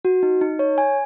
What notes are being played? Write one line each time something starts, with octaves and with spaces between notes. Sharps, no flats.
F#4
D#4
D#4
C#5
G#5